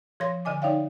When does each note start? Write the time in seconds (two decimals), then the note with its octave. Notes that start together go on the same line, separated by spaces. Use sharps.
0.20 F3 C#5 C6 A#6
0.45 D3 D#5 G#5 D6
0.62 D#4 C#5 D5 E5 F5 G5